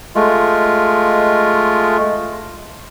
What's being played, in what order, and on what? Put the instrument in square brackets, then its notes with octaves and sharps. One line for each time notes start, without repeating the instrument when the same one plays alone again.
[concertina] G#3 A3 F4